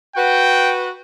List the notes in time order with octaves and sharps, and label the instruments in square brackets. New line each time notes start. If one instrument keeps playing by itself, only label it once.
[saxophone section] F#4 B4 [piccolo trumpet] G5